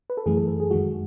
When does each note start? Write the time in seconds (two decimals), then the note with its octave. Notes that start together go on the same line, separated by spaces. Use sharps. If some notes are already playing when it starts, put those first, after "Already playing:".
0.10 B4
0.17 A4
0.26 F#2 E3 A3 G#4
0.37 A4
0.48 A4
0.60 G#4
0.71 F#2 D#3 G#3 F#4